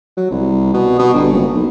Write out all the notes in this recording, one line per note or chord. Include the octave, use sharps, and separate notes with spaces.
F#3
C2
B2
B2
G1
F#1
B1